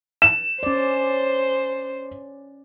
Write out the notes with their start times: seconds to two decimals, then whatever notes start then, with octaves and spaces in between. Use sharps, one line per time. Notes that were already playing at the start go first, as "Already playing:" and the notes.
0.22 E7
0.63 C#4 C5 D5